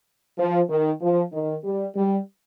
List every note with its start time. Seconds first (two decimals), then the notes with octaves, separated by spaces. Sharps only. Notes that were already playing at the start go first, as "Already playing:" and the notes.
0.39 F3
0.69 D#3
1.01 F3
1.33 D#3
1.64 G3
1.96 G3